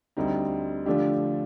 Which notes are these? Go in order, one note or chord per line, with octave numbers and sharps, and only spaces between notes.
D2 D3 G3 C4 D#4
D3 F3 A3 D4 G4